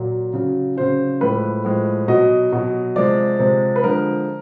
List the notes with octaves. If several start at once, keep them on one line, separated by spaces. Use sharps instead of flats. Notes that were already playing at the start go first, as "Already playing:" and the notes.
Already playing: A#2 F#3
C#3 F#3
C#3 F#3 C5
A2 F3 G#3 B4
A2 F3 G#3
B2 F#3 D#5
B2 F#3
C3 F3 G#3 D5
C3 F3 G#3
B4
D3 F3 G#3 A#4